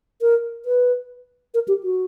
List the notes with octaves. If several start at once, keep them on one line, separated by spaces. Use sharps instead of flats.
A#4
B4
A#4
G4
F#4